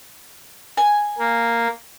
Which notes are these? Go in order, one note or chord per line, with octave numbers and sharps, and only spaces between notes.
G#5
A#3